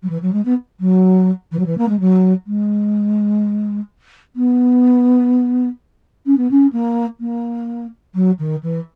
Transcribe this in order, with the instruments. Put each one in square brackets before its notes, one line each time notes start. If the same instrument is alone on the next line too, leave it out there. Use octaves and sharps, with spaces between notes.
[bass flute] F#3
E3
F#3
G#3
B3
F#3
E3
F#3
E3
A#3
G#3
F#3
G#3
B3
C#4
B3
C#4
A#3
A#3
F#3
D#3
E3